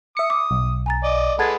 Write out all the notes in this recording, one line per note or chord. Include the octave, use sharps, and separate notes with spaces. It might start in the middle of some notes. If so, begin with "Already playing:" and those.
E5 D#6 C#7
D6
B1
G#5 A#5 A6
D5 D#5
G#3 A4 B4 F#5 G#6 A6